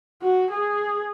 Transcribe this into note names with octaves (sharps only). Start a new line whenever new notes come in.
F#4
G#4